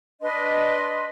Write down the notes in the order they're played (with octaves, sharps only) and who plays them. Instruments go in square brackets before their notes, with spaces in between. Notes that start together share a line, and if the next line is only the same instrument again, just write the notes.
[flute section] D4 B4 D#5 C6